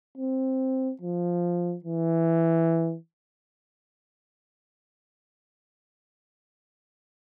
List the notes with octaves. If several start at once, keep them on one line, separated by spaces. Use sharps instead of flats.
C4
F3
E3